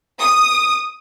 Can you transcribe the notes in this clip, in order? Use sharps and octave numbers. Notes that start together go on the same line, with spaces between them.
D#6